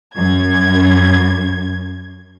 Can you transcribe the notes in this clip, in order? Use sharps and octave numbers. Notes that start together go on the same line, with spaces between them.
F#2 G#6